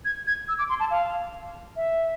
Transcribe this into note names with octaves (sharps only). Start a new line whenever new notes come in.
G#6
G#6
E6
D6
C6
A5
F5
E5